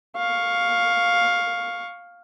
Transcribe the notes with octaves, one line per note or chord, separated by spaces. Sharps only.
F5 C#6